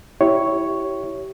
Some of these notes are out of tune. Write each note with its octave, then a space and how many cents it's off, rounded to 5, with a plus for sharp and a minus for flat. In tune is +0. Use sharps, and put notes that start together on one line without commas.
E4 -5 G4 -20 C#5 +0